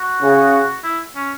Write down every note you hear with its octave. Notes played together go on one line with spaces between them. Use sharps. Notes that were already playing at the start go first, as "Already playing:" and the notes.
Already playing: F#4
C#3
E4
C#4